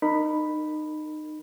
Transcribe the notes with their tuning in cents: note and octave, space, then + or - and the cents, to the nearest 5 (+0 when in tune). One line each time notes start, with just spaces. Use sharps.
D#4 -25 A#4 -25 B5 +0